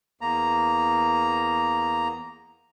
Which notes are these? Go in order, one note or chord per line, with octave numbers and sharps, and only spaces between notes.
E2 A#3 A#5